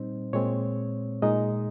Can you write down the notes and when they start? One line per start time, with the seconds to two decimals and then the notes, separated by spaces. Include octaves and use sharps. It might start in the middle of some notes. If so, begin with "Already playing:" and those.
Already playing: A#2 G3 C4 D#4 C5
0.33 A#2 G#3 C4 C#5
1.22 A#2 G#3 D#4 D#5